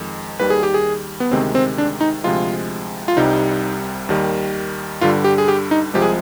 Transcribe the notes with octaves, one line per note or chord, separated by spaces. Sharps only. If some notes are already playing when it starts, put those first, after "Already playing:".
Already playing: F2 D#3 G#3
D#2 D#3 G3 B4
G#4
G4
G#4
B3
D2 C3 D#3 G#3 C4
C4
D4
D#4
D2 C3 F3 G#3 F4
F4
C2 C3 G3 D#4
D#2 D#3 G3
G2 D3 G3 F4
G4
G#4
G4
D#4
C2 C3 F3 G#3 G4
G#4